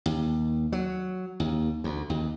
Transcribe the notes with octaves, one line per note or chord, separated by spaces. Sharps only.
D#2
F#3
D#2
D2
D#2